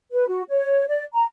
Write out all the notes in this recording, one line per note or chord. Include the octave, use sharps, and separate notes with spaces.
B4
F#4
C#5
D5
A#5